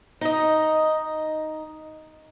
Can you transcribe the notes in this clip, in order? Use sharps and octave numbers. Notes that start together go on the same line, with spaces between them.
D#4 D#5